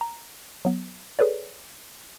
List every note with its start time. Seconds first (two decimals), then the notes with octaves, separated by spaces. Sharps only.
0.01 A#5
0.65 F#3 B3
1.19 G#4 A4 B4 C#5 D5